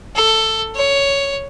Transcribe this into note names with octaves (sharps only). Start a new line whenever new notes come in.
A4
C#5